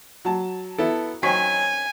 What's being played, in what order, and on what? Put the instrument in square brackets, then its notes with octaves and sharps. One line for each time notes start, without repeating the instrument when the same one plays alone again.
[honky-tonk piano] F#3 A5
[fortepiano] B3 E4 A4
[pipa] D#3 C4 C#4 [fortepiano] F#3 [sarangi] G#5 [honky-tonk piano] B6